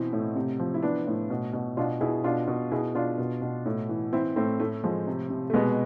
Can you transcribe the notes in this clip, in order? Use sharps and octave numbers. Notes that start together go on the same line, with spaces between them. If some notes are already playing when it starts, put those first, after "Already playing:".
Already playing: B2 E3 C4 E4
A2
C3
F3
E4
E3 B3 D4
A2
B2
B2
B2 D4 F4
B2 E4 G#4
B2 D4 F4
B2
B2 E4 G#4
B2 D4 F4
B2
B2
A2
E3
E3 C4 E4
A2 A3 C4
A2 A3
F3 G#3
C3
C3
A3
B2 G#3 B3